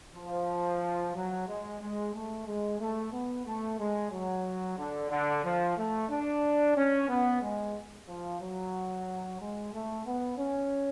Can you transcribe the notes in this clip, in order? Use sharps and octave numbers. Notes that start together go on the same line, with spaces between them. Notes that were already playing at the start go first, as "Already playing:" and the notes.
F3
F#3
G#3
G#3
A3
G#3
A3
B3
A3
G#3
F#3
D3
D3
F3
A3
D4
C#4
B3
G#3
F3
F#3
G#3
A3
B3
C#4